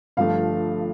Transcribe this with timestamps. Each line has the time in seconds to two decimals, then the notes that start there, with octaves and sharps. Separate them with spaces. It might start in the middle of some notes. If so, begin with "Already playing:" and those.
0.17 G1 G2 F3 A3 F5